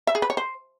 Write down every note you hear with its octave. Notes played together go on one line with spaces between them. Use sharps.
E5
G#4
B4
C#5
C5